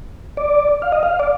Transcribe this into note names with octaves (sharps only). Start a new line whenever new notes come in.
D5
F5
D#5
F5
D5